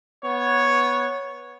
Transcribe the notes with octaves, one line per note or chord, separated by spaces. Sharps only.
B3 C#5